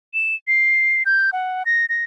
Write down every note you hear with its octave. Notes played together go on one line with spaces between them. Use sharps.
E7
C7
G6
F#5
A#6
A#6